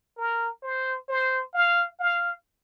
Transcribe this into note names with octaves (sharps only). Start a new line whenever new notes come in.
A#4
C5
C5
F5
F5